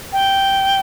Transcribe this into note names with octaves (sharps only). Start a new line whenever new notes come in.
G5